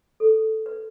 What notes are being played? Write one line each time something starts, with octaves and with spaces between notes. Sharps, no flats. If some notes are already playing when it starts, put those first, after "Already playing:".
A4
B4